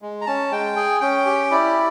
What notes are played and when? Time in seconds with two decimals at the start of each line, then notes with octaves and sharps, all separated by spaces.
0.02 G#3
0.21 A#5
0.27 C#4 A5
0.51 G#3 G5
0.76 G#4
1.01 C#4 G5
1.26 G4
1.51 E4 D5